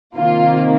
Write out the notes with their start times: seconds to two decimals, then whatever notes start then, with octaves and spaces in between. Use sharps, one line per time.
0.16 C3 D#3 A#3 F4